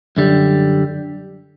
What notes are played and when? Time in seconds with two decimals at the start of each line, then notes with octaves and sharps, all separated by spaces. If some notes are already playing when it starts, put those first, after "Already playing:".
0.17 F#2 D3 G3